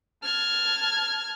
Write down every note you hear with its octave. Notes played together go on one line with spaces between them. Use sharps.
A5 F6 G#6